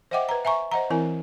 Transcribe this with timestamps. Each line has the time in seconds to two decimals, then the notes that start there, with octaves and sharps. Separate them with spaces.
0.11 C5 D#5 E5 F#5 G5 D6
0.29 B4 A#5
0.45 E5 G#5 A#5 C#6
0.71 C5 D#5 F#5 A#5
0.90 E3 C4 E4 A#4 G#5